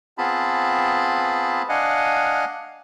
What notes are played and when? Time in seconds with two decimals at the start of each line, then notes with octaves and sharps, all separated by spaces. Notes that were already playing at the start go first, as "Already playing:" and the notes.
0.18 B3 C4 F4 G#4 A5 B5
1.69 D4 D#5 F5 F#5 G#5